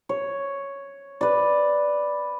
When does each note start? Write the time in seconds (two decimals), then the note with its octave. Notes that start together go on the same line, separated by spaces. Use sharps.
0.09 C#5
1.21 B4 D5